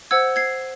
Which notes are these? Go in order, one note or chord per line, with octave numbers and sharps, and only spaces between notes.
C5 F#5 E6 G#6
G#6 C7